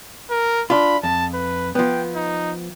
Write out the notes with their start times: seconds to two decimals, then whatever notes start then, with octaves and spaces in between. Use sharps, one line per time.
0.31 A#4
0.70 D4 F4 B5
1.03 F2 A5
1.34 B4
1.75 F3 B3 G5
2.16 D#4